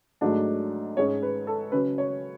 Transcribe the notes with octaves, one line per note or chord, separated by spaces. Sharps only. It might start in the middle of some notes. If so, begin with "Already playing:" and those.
G#2 F#3 A3 D4
G#2 G#3 C#4 C#5
B4
A4
C#3 F#3 C#4 B4
C#5